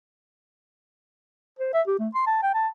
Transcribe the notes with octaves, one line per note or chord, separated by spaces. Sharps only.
C5
E5
G4
A3
C6
A5
G5
A5